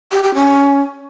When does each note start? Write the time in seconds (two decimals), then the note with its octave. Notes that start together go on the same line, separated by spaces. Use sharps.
0.12 G4
0.23 G4
0.34 C#4